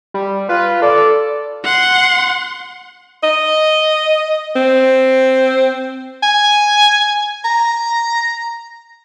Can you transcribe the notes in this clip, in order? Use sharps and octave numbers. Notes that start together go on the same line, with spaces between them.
G3
F4 B4
A4 D5
F#5 C6
D#5
C4
G#5
A#5